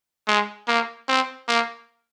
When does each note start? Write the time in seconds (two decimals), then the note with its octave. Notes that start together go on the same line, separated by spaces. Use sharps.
0.28 G#3
0.68 A#3
1.09 C4
1.48 A#3